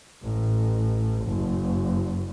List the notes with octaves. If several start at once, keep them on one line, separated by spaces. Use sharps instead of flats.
A1
F#1